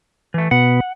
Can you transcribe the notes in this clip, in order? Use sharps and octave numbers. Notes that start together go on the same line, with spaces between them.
E3 A3
B2 B3 F#5